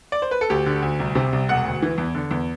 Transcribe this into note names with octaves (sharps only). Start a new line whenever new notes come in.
D5
C5
B4
A4
D2 G4
D3
D2
C2
C3
C2
E1 F#5
D2
E3
E2
D3
E2